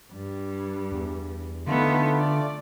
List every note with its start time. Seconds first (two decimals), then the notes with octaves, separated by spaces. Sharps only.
0.12 G2
0.92 E2
1.67 D3 A3 B3 D#4 F4
2.17 D5